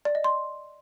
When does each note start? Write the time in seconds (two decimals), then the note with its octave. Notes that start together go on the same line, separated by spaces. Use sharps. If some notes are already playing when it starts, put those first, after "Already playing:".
0.05 D5
0.15 D#5
0.24 C6